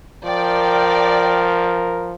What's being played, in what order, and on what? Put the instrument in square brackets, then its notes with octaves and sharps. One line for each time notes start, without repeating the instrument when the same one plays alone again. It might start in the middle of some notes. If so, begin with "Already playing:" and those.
[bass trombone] F3 [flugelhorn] A#4 [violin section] D5 G5